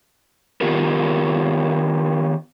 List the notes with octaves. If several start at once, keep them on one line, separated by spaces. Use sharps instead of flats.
D#3 E3 B3 F4 G4 A#4